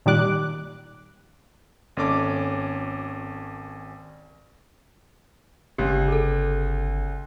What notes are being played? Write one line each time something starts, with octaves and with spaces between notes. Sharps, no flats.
A#2 D#3 G3 D6 F#6
G#1 A#3 C#4 A4 D6
G1 C#2 G4
G#4 A4